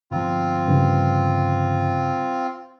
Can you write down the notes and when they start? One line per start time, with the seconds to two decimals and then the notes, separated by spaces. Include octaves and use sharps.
0.12 G1 F3 C4 F4
0.68 G2 C#3